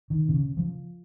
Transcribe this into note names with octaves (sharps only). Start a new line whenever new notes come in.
D#3
C3
C#3
F3